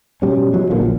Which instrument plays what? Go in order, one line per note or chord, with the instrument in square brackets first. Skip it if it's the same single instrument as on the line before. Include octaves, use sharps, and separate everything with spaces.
[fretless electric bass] B2 G3 C#4
E3 F#3 G#3
A1 A#2 D3 F3
A#1